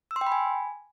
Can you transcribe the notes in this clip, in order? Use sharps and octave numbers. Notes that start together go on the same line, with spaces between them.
E6
C6
G5
B5
G#5